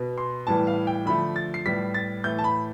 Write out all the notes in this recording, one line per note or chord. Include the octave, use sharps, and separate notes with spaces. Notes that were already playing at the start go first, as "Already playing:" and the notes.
Already playing: B2 B3
C6
A2 E3 G3 B3 A5
F5
G5
D3 F3 A3 B5
A6
C7
A2 G3 B3 B6
A6
A2 E3 A3 G6
A5
B5